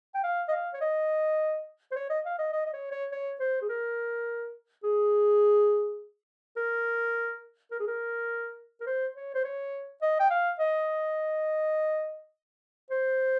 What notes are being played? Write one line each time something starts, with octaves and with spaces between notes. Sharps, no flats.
G5
F5
D#5
F5
C#5
D#5
C5
C#5
D#5
F5
D#5
D#5
D#5
C#5
C#5
C#5
C5
G#4
A#4
G#4
A#4
A#4
G#4
A#4
A#4
C5
C#5
C5
C#5
D#5
G5
F5
D#5
C5